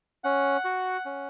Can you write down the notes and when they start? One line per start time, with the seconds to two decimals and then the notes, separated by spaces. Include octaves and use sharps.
0.24 C#4 F#5
0.65 F#4
1.06 C#4